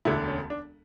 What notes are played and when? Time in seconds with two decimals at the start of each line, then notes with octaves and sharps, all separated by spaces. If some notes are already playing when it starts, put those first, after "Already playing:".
0.05 E1 D2 D3 E4
0.28 C#4
0.50 D4